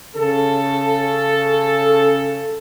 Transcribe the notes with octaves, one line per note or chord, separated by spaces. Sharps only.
C#3 A4